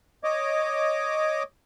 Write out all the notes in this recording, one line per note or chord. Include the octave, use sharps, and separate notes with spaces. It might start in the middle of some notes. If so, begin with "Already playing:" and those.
C#5 D#5 D6